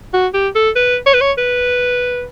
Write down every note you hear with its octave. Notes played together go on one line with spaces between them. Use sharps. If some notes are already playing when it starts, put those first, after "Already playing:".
F#4
G4
A4
B4
C#5
B4
C#5
B4